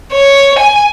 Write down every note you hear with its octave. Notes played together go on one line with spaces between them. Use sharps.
C#5
G#5